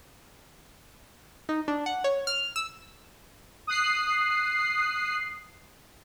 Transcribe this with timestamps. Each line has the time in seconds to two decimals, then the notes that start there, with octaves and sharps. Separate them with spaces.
1.49 D#4
1.68 D4
1.86 F#5
2.04 C#5
2.27 F6
2.56 E6
3.67 D#6 F#6 C7